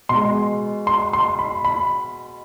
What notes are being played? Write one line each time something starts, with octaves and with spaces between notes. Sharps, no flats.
B2 G#3 C6
C6
C6
B5
B5